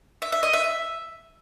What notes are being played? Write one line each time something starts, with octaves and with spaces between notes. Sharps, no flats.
E5
E5
D#5
E5
E5